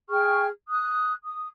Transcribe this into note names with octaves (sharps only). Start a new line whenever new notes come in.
G#4 G5 C#6 F6
D#6 F#6
D#6